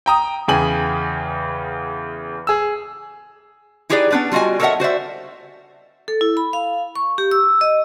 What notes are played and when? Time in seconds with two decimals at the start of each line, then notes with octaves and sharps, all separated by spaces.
0.06 G5 A#5 D#6
0.48 E2 C#3 G5 G#5 F#7
2.47 G#4 E6
3.89 D#4 E4 G4 G#4 B4 D5
4.10 B3 C#4 D4 B4 D5
4.32 G3 F4 F#4 D#5 G#5
4.60 A4 A#4 C#5 D#5 E5 F#5
4.80 F#4 C5 D5 E5
6.08 A4
6.21 E4
6.37 B5
6.53 F5
6.96 C#6
7.18 G4
7.31 E6
7.61 D#5